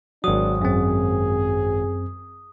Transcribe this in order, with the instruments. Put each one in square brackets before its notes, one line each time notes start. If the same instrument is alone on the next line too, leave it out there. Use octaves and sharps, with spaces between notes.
[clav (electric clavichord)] G#1 F#3 [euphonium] D4 [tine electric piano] F#4 [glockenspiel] D#6
[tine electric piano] F#2 C4 [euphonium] G#4